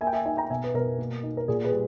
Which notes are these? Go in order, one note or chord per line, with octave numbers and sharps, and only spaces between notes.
A#3 E5 G#5
G5
E5 G#5
D#4 E5 G#5
G5 A#5
B2 E5 G#5
B4
B2 A#4
A#3
D#4
A#4
A#2 G#4
G#4 B4
G3